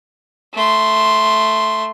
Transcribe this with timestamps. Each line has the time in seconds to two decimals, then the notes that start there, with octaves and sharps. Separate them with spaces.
0.54 A3 C6